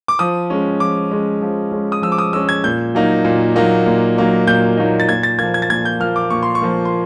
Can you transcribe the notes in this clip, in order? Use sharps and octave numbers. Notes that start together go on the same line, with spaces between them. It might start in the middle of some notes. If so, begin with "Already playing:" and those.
D6
F3 D#6
G#3 C#4
F3 D6
G#3 C#4
F3
G#3 C#4
D#6
F3 E6
D6
D#6
G#3 C#4 E6
G#6
A#2 G6
F#3 A#3 D#4
A#2
F#3 A#3 D#4
A#2
F#3 A#3 D#4
A#2 G6
F#3 A#3 D#4
A6
A#2 G#6
A6
F3 A#3 G#6
G#6
A6
A#2 G#6
G6
F3 A#3 F6
D6
A#2 C#6
C6
C#6
F3 A#3
C6